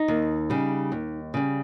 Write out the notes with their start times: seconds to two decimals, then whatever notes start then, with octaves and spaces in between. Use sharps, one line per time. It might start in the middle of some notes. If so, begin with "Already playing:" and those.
Already playing: D#4
0.08 D#2
0.50 C#3 G3
0.92 D#2
1.34 C#3 G3